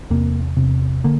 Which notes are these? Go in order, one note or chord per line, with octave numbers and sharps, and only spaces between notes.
E2 C3 A#3
E2 C3
D3 A#3